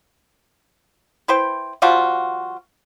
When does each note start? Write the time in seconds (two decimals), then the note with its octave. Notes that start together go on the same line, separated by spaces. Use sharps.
1.28 E4 B4 C5 G5
1.82 F3 G3 F4 F#4